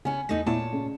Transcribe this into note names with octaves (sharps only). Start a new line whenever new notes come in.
C#3 B3 C#4 G#5
E2 A3 B3 D#4 A#6
A#2 A3 B3 E4 C#5 A5
C#3